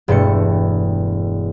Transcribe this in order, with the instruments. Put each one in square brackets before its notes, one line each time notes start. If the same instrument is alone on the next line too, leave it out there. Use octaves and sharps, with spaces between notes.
[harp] E1 G2 A3 C#7